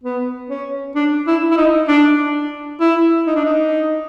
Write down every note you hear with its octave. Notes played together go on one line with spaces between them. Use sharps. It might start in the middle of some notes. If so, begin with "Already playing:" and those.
B3
C#4
D4
E4
E4
D#4
D4
E4
D#4
D4
D#4